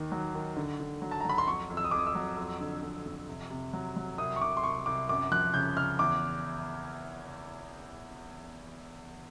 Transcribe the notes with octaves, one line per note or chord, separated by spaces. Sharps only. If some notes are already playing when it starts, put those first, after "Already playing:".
Already playing: D#2 D#3
F#3
D#3
D3
D3
F#3
A5
A#5
F#3 B5
C6
F2 C#6
F2
E6
D#6
F2 D6
D#6
E6
F#3
F2
D3
F2
F2
C3
C3
F#3
F#3
C2 D#6
C#6
C2 D6
C6
C2 C#6
C2 D6
F#2 D6
F3 F#6
C#3 G6
C#3 F6
E2 D6